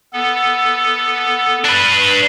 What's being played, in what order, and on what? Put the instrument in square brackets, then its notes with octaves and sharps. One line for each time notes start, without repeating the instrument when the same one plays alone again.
[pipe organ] B3 A4
[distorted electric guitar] D4 B4 [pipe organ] F#6